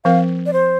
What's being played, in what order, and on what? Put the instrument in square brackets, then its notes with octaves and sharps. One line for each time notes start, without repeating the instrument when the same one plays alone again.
[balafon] F3 C4 A#4 [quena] F5
[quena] D5
C5